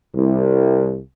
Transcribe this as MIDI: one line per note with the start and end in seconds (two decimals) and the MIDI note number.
0.15 0.95 36